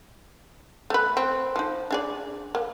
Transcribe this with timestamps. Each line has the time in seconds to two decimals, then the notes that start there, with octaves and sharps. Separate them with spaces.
0.90 A3 B4
1.17 C4
1.56 F3 D#4
1.91 D4 G#4 D5
2.55 A#3